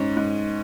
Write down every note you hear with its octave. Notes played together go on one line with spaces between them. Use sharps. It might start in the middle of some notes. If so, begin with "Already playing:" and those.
Already playing: G#2 C#4
G#2